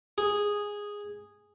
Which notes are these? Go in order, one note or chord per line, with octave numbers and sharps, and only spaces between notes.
G#4